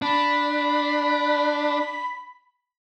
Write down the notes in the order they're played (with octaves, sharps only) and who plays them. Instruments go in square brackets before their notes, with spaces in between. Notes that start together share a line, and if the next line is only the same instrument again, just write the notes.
[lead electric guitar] D4 [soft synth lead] B5